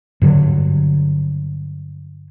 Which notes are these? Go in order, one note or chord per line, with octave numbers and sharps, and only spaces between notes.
G2 D3 F#3